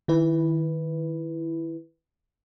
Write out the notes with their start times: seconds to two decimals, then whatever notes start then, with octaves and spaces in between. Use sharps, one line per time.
0.08 D#3 E4 B4